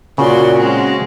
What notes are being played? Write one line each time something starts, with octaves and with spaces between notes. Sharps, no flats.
A#2 C#3 C#4 F#4 D5 C6
G#3 C4